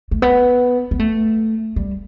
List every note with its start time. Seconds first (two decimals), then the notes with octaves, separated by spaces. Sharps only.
0.11 A3
0.22 B3
0.91 B3
0.99 A3
1.76 G3